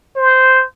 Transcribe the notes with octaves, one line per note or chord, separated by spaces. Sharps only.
C5